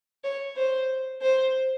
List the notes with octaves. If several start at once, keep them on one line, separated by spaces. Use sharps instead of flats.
C#5
C5
C5